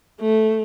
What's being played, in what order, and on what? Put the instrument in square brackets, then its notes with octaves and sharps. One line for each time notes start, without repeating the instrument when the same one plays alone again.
[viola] A3